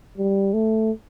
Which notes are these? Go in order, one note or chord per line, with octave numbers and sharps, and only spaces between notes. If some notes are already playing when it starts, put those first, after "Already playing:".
G3
A3